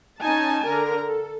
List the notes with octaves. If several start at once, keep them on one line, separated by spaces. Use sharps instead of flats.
C#4 D#4 G#5 A5
D3 A#4
A4